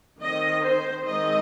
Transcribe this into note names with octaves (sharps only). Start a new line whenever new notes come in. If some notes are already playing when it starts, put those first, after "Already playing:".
D#3 C4 D#5
C5
D#3 G#3 C4 D#5